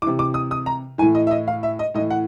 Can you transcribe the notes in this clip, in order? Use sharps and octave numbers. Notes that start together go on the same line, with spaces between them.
C3 E3 D6
D6
D#6
D#6
A#5
A2 E3 G#5
D#5
E5
D#5
F5
E5
D#5
A2 E3 D#5
F#5